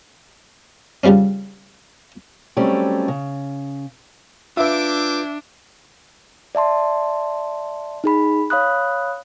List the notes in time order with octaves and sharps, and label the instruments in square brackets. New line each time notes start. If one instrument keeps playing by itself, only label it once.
[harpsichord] C#3 F3 G3 C4 C#4
[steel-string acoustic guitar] F#3 G3 A3 C4 C#4 G4
C#3
[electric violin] D4 [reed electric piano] F4 B4 [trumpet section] G#4 G5 D6 [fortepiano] E5 E6
[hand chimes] D5 E5 A5 C6
D#4 G#4 B5
C#5 F5 B5 D#6 F#6